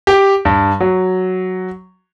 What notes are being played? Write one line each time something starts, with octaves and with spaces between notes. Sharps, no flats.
G4
G2
F#3